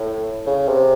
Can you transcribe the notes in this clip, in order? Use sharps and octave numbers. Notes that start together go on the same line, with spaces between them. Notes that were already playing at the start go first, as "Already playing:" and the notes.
Already playing: A2
C#3
C3